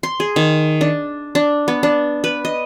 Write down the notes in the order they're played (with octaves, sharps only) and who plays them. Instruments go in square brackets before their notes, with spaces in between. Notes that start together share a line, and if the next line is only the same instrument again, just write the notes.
[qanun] C6
G#4
D#3
D4
D4
B3
D4
B4
D#5